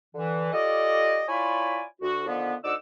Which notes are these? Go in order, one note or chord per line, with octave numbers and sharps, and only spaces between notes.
D3 E3
F4 G4 A4 D5 D#5
E4 F4 C#5 D5 G#5 B5
D2 F#4
D3 D#3 F3 B3
D2 D#4 D5 F#5 D6 E6